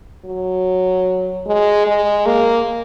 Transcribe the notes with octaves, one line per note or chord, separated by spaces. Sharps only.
F#3
G#3
G#3
A#3